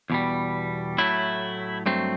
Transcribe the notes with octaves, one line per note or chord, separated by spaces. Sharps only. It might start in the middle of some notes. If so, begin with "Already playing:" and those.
E2 B2 G3
A2 F#3 A3 E4
G2 F#3 A3 C4